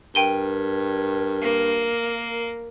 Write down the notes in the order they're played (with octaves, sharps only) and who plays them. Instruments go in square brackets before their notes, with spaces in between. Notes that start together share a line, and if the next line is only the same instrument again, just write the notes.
[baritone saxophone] G2 [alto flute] A#4 [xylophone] G5 D#7 G7
[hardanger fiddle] A#3